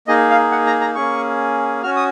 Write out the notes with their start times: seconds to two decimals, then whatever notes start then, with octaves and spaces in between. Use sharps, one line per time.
0.07 A#3 D#4 G#4 D#5
0.30 F5
0.52 F#5
0.66 A#5
0.81 A#5
0.95 A#3 C#4 G#4 C#6
1.83 C#4 F#4 F6
1.96 D#6